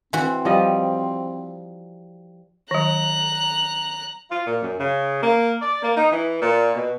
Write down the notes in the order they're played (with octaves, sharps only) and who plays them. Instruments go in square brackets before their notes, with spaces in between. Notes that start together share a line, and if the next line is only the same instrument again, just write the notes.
[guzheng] E3 F#4 [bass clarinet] C4
[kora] F3 G3 D#5
[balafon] D#3 F#3 [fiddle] A#5 F#6
[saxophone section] F4
A#2
F#2
C#3
A#3
D5
A#3
D#4
E3
A#2
B2